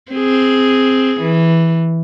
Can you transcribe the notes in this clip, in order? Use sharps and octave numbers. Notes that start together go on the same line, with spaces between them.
C4 G#4
E3